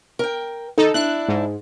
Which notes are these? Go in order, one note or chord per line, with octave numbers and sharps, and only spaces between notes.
A#4 G5
D#3 D#4 A4
D4 E4 F#6
G#2